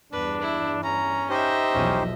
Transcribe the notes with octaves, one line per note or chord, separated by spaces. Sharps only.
E2 G2 D4 B4
E4
C#4 A#5
D#4 G4 C5 D#5 E5
B1 E2 F3 C#4